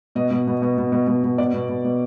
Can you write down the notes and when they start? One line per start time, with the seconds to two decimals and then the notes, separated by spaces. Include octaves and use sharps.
0.15 B2 D#5
0.31 B2
0.47 B2
0.62 B2
0.78 B2
0.92 B2
1.07 B2
1.23 B2
1.38 B2 D5
1.54 B2
1.69 B2
1.84 B2